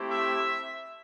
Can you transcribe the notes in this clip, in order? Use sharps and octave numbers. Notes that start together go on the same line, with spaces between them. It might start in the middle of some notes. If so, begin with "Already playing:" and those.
Already playing: A3 C4 E4 G4
E5